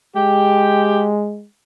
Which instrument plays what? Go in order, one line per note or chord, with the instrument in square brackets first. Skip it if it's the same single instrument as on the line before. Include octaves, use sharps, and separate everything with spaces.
[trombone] G#3 [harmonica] G4 G5